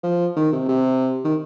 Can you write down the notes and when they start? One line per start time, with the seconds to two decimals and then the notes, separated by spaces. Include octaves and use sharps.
0.04 F3
0.37 D#3
0.53 C3
0.69 C3
1.25 D#3